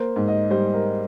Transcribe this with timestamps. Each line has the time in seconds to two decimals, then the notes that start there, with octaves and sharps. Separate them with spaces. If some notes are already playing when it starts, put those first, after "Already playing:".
Already playing: A#3 C5
0.16 G#2
0.28 D#5
0.50 G3 C5
0.74 A#4